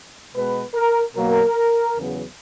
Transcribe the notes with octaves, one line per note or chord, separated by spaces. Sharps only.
B2 G#3 B3 B4
A#4
B2 F#3 A#3 A#4
E2 C#3 F#3 B3